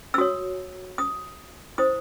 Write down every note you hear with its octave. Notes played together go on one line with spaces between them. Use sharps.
E6
F#4 C#5 D#6
D#6
E4 C5 D#6